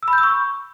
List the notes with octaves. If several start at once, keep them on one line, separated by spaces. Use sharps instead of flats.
E6
B5
G6
E6
C#6